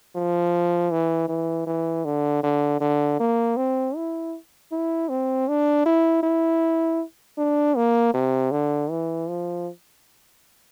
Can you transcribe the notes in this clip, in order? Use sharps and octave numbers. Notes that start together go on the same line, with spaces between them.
F3
E3
E3
E3
D3
D3
D3
A#3
C4
E4
E4
C4
D4
E4
E4
D4
A#3
C3
D3
E3
F3